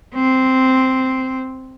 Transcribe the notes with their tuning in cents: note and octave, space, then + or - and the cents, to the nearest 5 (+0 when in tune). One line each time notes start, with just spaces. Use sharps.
C4 -5